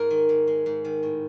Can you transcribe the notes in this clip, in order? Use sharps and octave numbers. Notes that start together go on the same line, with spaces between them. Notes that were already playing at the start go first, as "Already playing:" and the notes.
Already playing: G#2 A#4
D#3
G#2
G#3
G#2
D#3
A2